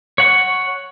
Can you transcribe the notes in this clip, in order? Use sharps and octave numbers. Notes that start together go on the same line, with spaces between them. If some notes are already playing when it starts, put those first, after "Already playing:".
C#5 F#5 C#6